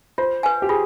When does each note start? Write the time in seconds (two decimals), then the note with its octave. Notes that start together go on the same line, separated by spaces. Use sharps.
0.18 F4 C5
0.43 B4 F5 G#5
0.62 G4
0.69 F4 G#4